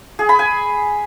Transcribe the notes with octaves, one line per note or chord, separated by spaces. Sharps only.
G#4
B5
G#5